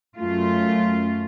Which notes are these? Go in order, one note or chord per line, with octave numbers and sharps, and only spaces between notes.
F#2 A3 F4